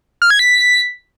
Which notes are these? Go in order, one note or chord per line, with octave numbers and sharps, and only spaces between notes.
F6
G#6
B6